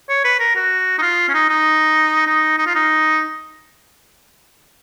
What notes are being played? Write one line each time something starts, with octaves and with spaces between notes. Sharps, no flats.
C#5
B4
A#4
F#4
D#4
F4
C#4
D#4
D#4
D#4
D#4
F4
D#4